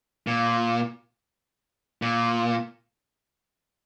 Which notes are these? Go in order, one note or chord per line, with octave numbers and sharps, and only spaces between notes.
A#2
A#2